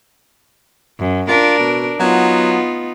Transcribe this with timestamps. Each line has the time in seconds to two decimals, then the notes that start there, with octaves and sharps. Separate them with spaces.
0.99 F#2
1.28 D4 F4 A#4
1.59 B2
2.00 F#3 B3 D#4 F4